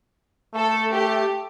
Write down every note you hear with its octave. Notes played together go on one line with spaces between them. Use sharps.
A3 A4
G4